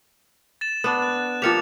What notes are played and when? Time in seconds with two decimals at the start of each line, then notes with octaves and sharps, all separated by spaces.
0.61 A6 E7
0.84 B3 D4
1.02 F#6
1.42 F3 A#3 G4 A6 C#7 F7